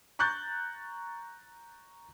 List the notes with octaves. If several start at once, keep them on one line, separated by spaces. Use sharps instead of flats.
A#5 C#6 F#6 G6 A6